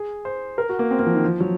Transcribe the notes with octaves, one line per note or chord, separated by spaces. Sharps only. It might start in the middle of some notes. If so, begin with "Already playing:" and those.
Already playing: G#4
C5
A#4
F#4
A#3
C4
A#3
F3
D#3
F3
F#3